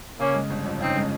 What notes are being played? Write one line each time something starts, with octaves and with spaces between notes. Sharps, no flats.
C#3 A#3 C#4
G#3
G1
F2
C#3 C4 D#4
G#3